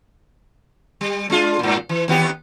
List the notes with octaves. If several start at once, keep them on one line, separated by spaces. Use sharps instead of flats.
G3
G#3 D4 F4
G2 A#2
E3
D#2 B3 G4